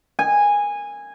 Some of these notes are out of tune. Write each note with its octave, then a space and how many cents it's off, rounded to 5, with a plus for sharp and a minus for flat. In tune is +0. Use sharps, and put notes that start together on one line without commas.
G#5 -15